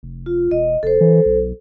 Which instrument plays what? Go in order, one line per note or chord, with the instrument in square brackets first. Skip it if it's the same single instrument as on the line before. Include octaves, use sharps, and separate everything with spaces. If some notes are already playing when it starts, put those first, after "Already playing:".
[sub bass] F1
[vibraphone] F4
[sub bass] E1 [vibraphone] D#5
[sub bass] F1 [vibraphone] A4 C5
[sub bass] E3
B1